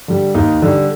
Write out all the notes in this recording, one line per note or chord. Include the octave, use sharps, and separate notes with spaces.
D3 G3
D#2 D#4
D3 G3